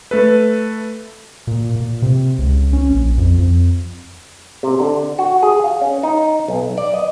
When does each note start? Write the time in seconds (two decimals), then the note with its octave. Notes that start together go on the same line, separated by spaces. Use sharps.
0.11 A3 A4 B4
1.47 A#2
1.76 A#2
2.02 C3
2.39 C#2
2.73 C#4
2.90 A#1
3.18 F2
3.38 F2
4.63 C3
4.80 D3
5.18 F#4
5.43 G#4
5.64 F5
5.81 C#4
6.03 D#4
6.48 B1
6.78 D5
6.94 D#5